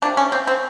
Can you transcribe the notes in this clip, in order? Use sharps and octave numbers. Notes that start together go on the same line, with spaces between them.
C3 F3 A#3 D4
C#4
C4
C4